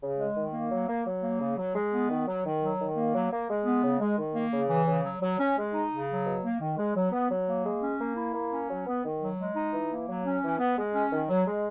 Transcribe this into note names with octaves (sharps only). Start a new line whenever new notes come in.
C#3
G#3
D#3
A#3
F#3
A#3
F#3
A#3
C#3
F#3
G#3
B3
D#3
F#3
D#3
F#3
D#3
A#3
F#3
A#3
G#3
B3
C#3
G#3
D#3
A#3
C#3
E3
C#3
F#3
F#3
C#4
G#3
D#4
C#3
F#3
B2
A#3
D#3
G#3
F#3
B3
F#3
A#3
G#3
C#4
A#3
E4
A#3
C#4
F#3
B3
D#3
F#3
G#3
D#4
E3
A#3
F#3
C#4
E3
B3
G#3
C#4
D#3
F#3
G#3